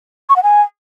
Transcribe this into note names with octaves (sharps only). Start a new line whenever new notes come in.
C#6
F#5
G#5